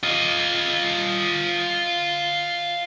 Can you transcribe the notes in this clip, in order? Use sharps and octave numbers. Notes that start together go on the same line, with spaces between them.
F4 D#5